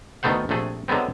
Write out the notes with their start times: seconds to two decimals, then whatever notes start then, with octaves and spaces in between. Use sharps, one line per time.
0.23 D2 D#3 A3 B3 C5 F#5
0.49 A#1 C3 A3 G#4
0.88 D3 F#3 G#3 B3 C4